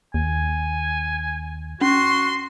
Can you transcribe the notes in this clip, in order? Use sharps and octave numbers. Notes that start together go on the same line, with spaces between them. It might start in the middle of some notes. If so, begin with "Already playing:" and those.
D#2 G#5
C#4 F#4 C6